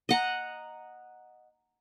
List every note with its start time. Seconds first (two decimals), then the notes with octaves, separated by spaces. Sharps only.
0.09 D#5 F#5 A#5